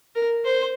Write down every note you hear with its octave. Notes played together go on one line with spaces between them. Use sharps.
A#4
C5